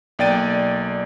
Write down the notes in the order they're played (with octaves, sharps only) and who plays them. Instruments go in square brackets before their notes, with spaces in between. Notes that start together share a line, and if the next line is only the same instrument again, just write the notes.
[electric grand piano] B1 A#3 D5 G5 A6 D#7